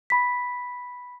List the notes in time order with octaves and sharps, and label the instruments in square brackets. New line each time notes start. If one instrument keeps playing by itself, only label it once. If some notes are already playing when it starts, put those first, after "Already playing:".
[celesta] B5 B6